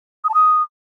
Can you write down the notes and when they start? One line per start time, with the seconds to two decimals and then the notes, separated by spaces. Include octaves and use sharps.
0.24 D#6
0.29 A5
0.34 D#6